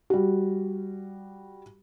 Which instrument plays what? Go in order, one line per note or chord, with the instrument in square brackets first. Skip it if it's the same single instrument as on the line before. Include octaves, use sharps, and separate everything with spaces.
[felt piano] G3 F#4